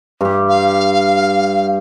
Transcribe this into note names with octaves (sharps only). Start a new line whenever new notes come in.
G2 G4
F5